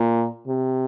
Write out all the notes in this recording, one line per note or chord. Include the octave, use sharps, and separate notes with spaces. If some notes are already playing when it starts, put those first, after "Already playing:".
Already playing: A#2
C3